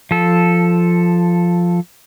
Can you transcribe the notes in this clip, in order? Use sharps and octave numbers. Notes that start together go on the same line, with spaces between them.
F3 A4